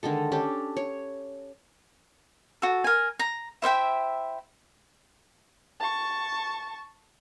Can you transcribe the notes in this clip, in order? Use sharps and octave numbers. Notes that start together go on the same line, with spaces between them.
D3 D#3 G#3 A4
C#4 D4 G4 A4
C#5
F#4 A4
A#4 G#5
A#5
E4 C5 E5 G5
A5 C#6